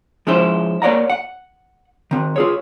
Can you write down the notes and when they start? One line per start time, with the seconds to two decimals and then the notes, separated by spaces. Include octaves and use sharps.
0.27 F3 G#3 C#4 E4 C5
0.82 A#3 C#5 D5 F#5 A#5
1.10 F#5
2.11 D#3 C4
2.36 F4 G#4 C#5